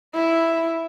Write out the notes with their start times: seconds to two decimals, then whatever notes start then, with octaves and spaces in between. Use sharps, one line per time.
0.14 E4